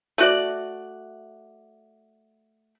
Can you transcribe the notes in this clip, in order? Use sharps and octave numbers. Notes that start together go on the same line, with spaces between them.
A3 F#4 D5